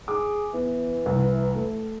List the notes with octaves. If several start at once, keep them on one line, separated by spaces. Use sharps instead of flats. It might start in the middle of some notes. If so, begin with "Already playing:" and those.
G#4 D6
E3 B3
C2
A3